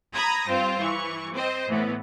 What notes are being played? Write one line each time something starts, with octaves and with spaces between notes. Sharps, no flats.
A#5 B5 D#6 G#6 A#6
G2 C4 F4 C5
E3 C#6
C4 C5 D#5
A2 E3 B3